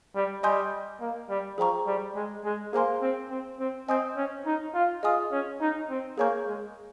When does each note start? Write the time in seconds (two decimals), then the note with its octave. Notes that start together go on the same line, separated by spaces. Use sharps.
0.15 G3
0.43 G3 D#5 G#5 C6 D#6 G6
1.01 A#3
1.29 G3
1.58 F3 G#4 C5 G5 A#5 C#6
1.86 G3
2.15 G#3
2.44 G#3
2.73 A#3 G#4 C5 F5 G#5 C6
3.02 C4
3.30 C4
3.59 C4
3.89 C4 D#5 G#5 D#6 G6
4.16 C#4
4.46 D#4
4.74 F4
5.03 F4 G#4 D#5 G#5 D#6
5.32 C#4
5.61 D#4
5.90 C4
6.18 A#3 G#4 C#5 G#5 C#6 G6
6.46 G#3